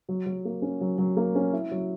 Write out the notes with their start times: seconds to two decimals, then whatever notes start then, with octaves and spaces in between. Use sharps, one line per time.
0.09 F#3
0.26 F#3
0.45 A#3
0.62 C#4
0.81 F#3
0.98 F#3
1.17 A#3
1.35 C#4
1.52 E4
1.71 F#3